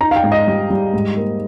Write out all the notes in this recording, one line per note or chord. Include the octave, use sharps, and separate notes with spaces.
D#4 A#5
F5
G5
G#2
D#5
G3
G3
G#2
A#3